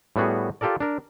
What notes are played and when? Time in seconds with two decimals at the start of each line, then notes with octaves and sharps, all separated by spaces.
0.16 A2 G3 B3 F#4 G#4
0.61 F4 G4 A4 A#4 D5
0.80 D4 A#4